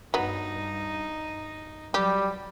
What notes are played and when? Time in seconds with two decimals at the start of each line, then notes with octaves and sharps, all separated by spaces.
0.14 G2 F#3 B3 D#4
1.94 F#3 G3 G4